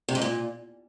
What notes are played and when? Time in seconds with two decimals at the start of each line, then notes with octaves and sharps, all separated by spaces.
0.09 C3
0.15 G#2
0.22 A#2